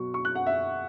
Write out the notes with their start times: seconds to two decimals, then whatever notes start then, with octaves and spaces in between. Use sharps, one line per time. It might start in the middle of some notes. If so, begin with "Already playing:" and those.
Already playing: B2 F#3 C#6
0.14 C#6
0.25 F#6
0.35 F#5
0.47 E5